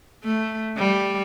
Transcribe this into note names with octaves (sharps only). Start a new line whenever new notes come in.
A3
G3